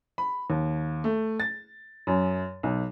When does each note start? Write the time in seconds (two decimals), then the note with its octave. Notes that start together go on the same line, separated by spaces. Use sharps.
0.18 B5
0.50 D#2
1.04 A3
1.40 A6
2.07 F#2
2.63 B1